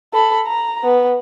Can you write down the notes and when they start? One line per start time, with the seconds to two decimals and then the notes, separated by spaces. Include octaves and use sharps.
0.13 A4 B5
0.46 A#5
0.83 B3